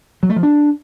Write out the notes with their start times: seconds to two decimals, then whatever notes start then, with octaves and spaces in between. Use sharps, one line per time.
0.23 F#3
0.30 A3
0.36 F3
0.43 D4